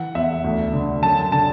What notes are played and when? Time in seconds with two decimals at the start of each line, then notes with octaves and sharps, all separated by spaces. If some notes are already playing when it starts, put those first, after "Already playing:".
Already playing: E3 F#5
0.15 E2 E5
0.44 D2
0.73 D3
1.03 F#2 A5
1.32 D3 A5